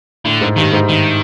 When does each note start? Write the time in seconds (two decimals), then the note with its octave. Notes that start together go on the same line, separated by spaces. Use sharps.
0.25 A2 D3
0.41 G#2
0.56 G2 D#3
0.73 G#2
0.89 G2 D#3